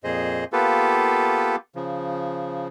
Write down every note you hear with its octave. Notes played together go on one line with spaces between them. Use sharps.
F2 A#2 G#4 C5 D#5
A#3 B3 F4 G4 A4 B4
C#3 F3